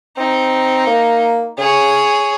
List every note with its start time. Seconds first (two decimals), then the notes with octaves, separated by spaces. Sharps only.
0.17 C4 D#4
0.87 A#3
1.58 C#3 G#4 C#5